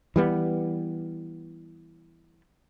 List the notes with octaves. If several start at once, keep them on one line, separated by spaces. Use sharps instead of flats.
E3 G3 B3